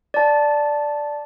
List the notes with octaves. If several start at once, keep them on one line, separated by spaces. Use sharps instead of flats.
D5 A5